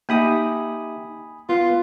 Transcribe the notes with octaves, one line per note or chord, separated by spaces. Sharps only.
A#3 D#4 G4 E5 G#5 B5 D#6
B3 F4